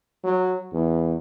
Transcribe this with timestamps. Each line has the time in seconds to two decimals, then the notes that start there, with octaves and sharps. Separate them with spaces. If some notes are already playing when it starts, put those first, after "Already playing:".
0.24 F#3
0.73 E2